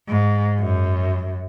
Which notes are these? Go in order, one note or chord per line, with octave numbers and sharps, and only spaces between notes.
G#2
F#2